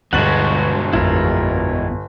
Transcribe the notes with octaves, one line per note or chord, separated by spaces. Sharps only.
G1 D2 B2 G#3 F#4 F#5 A6 F#7
A1 F2 E4 F4 A#4